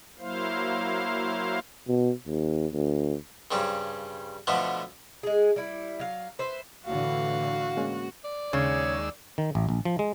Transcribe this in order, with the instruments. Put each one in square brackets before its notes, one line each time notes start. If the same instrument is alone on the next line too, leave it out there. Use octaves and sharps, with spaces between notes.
[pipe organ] F#3 A#3 E4 C5 F5
[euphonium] B2
D#2
D2
[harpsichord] G2 C#3 G3 C4
B2 D3 F3 A3 B3
[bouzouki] G#3 G#4
G3 E4
F#3 F5
B4 C5 E5
[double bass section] A2 D3 E3 [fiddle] F#4 [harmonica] F5
[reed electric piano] G#3 A#3 C#4
[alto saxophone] D5
[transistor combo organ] D#2 G#3 E6 [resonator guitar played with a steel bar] C#3 [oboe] C#5
[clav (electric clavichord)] D#3
A1
A#1
F3
G#3